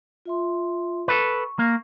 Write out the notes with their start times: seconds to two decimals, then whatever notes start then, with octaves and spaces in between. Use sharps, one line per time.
0.25 F4 E5 C6
1.08 A4 B4 C#6
1.59 A#3